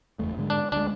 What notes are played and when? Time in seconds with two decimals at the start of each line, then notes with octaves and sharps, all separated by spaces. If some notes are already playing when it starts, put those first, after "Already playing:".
0.19 F#1 E2 A3
0.37 G#2 D3 G#3
0.50 D4
0.72 D2 G#3 D4